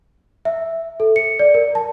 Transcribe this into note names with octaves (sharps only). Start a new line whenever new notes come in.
E5
A4
C#7
D5
A#4
A5